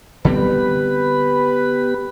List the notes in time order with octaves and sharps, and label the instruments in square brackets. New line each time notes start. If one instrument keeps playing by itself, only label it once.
[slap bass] D3 G3 C4 [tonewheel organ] B3 G4 B5 [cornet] B4